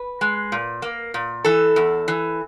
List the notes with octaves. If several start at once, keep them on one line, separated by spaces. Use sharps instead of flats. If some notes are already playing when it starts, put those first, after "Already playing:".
Already playing: B4
G#3
A#2
A#3
A#2
E3 A4
E2
E3